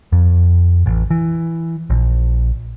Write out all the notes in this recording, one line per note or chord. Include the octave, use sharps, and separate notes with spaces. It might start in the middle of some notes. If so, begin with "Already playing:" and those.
F2
A1
E3
A#1